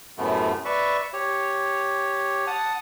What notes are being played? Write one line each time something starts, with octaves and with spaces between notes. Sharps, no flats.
F#2 A2 C3 A3 B3
B4 D5 E5 C#6
G4 C#5
F#5 A5 D#6